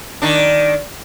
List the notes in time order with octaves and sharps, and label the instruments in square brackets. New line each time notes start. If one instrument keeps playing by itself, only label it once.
[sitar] D#3 D4